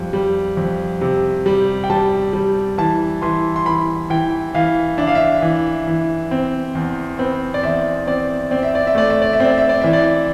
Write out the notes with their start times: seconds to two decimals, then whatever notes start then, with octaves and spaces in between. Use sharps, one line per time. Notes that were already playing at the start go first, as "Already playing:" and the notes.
Already playing: F2 G3
0.13 G3
0.57 F2
1.01 C3
1.46 G3
1.84 G5
1.90 G3 A5
2.33 G3
2.78 E3 A5
3.22 E3 C6
3.56 C6
3.66 E3 B5
4.10 E3 G5
4.54 E3 F5
4.98 D4 E5
5.07 F5
5.15 E5
5.42 E3
5.87 E3
6.31 C4
6.75 E2
7.19 C4 B4
7.54 D5
7.63 E2 E5
8.07 C4 D5
8.51 C4 D5
8.63 E5
8.75 D5
8.87 E5
8.95 A3 D5
9.10 E5
9.22 D5
9.33 E5
9.40 C4
9.46 D5
9.58 E5
9.69 D5
9.81 E3 E5
9.93 D5